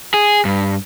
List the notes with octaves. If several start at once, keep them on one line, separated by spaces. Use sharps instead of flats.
G#4
G2